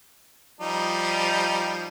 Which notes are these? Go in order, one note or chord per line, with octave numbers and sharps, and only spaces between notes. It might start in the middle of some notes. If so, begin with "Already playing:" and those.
F3 G3 D#4